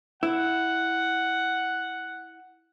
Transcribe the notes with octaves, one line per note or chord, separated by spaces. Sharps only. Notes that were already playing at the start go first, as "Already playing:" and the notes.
E4 F#5